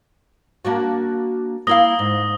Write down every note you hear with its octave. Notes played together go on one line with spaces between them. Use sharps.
A#3 D4 F#4
A#3 E4 F5 D#6 A#6 G7
G#2